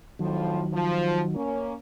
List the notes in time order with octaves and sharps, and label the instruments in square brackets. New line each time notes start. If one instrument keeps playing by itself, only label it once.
[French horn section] F2 A2 F3 [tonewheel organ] D#3 F#3
[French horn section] F3
A#3 C#4